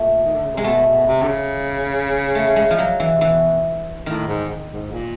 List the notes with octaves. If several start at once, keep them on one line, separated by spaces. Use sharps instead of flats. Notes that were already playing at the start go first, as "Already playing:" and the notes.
Already playing: A#2 A3
D#3
D3
C#3
C3 G#3
B2 A3
B2
C3
D3
C#3
A3
G#3
F3
F#3
E3
C3
B2 E3
A2 D#3
G#2
G#2
A#2